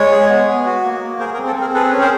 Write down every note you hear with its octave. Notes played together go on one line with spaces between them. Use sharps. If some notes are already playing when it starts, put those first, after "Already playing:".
Already playing: G#3 C#5
G#4
B3
B3
F#4
A#3
A#3
G#4 A#4 C5
G#4 A#4
C4
A4
C4
G#4 A#4
G#4 A4 B4
C#4
A#4 C5